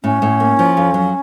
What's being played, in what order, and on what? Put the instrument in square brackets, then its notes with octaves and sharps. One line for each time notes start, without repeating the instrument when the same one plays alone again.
[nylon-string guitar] A2 [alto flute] C#4
[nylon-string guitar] A2
A#3
F3
F2
F#3